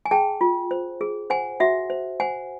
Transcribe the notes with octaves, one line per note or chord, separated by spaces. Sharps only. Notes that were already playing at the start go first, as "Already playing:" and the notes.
G#5
G#4 G5 A5
F4
C5
G#4
C5 F#5 G#5
F#4 E5 F#5
C5
C5 F#5 G#5